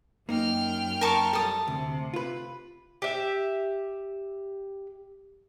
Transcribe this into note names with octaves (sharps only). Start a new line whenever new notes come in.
F#2 A#3 D#4 G5 F6
A#4 A5 C#6
G3 A4 A5 D#6
D2 C3
F4 B4
G4 E5